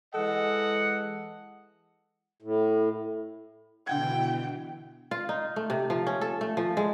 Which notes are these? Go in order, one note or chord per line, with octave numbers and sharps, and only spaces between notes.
E3 G#3 A4 D#5 F#5
A2
B2 D3 E3 F#5 G5 G#6
F4
D#4
A3
C3
F3
C#4
A4
A3
F3
G#3